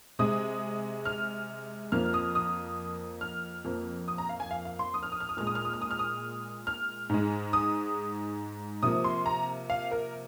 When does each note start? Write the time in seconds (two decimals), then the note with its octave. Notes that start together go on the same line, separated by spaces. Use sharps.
0.19 C3 G#3 D#6
1.05 F6
1.92 F2 F3 A#3 F6
2.14 D#6
2.35 D#6
3.21 F6
3.65 F2 F3 A#3
4.08 D#6
4.18 A#5
4.29 F5
4.40 G#5
4.51 F5
4.65 F5
4.79 C6
4.94 D#6
5.03 F6
5.12 D#6
5.20 F6
5.29 D#6
5.37 A#2 G#3 F6
5.47 D#6
5.55 F6
5.65 D#6
5.73 F6
5.81 D#6
5.91 F6
5.99 D#6
6.67 F6
7.09 G#2 G#3
7.53 D#6
8.83 C3 F3 A#3 D#6
9.04 C6
9.26 A#5
9.70 F5
9.91 A#4